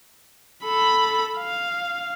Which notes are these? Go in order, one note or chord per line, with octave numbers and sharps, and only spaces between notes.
A4 B5
F5